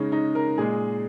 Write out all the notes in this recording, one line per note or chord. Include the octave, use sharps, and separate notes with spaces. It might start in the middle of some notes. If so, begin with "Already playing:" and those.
Already playing: C#3 G#3 C#4 D#4
D#4
A#4
A#2 G#3 G#4